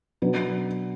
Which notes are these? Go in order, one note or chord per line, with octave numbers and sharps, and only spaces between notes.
B2 F#3 D4 B4